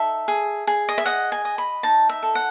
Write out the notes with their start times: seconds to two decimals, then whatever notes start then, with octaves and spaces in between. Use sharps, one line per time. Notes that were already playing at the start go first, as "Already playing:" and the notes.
Already playing: D#4 A4 E5
0.28 G#4
0.67 G#4
0.89 D#5
0.98 E5
1.05 D#5 F#5
1.32 G#5
1.45 D#5
1.58 B5
1.83 D#4 A5
2.09 E5
2.23 A4
2.35 F#5